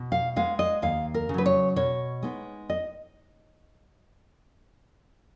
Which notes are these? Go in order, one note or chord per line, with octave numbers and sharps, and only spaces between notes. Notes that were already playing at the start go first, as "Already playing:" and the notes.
Already playing: B2
F5
G#3 B3 F5
D#5
D#2 F5
A#4
C#3
F#3 B4
C#5
B2 C#5
G#3 B3 D#4
D#5